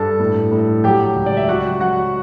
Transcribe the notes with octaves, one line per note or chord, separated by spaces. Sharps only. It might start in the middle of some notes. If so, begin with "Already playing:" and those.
Already playing: G2 A4 A5
A2
A2
F#3 G4 G5
C#2
D5
E5
F#3 F#4 F#5
F#3 F#4 F#5